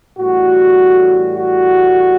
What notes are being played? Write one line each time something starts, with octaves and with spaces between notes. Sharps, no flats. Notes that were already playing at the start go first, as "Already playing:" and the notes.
A1 A2 G3 F#4
F#4